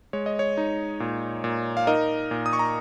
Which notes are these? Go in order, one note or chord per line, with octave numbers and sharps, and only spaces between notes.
G#3 C#5
D#5
C#5
D#4
A#2
A#2
F5
D#4 A#4 D#5
A#2
D#6
C#6
A#5